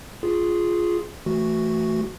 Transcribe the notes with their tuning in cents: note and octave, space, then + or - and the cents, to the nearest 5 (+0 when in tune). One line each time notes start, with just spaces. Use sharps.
F4 +0 G#4 +0
E3 +0 A3 +5 F#4 +0